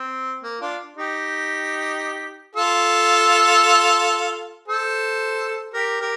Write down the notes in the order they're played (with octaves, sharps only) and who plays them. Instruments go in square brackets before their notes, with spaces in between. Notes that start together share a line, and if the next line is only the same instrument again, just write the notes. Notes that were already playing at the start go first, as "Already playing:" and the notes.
Already playing: [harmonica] C4
A#3
D4 F4
D#4 G4
F4 A4
A4 C5
G4 A#4
G4 A#4